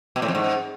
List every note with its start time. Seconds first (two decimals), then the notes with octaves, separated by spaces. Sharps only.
0.16 B2
0.22 A2
0.28 F2
0.35 G#2